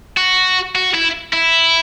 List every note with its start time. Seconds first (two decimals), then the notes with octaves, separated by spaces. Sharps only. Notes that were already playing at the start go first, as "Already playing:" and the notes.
0.17 F#4
0.75 F#4
0.94 E4
1.33 E4